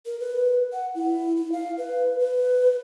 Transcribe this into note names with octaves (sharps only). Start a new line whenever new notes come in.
A#4
B4
F#5
E4
E4
F5
B4
B4